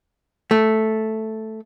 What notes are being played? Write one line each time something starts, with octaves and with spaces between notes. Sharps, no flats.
A3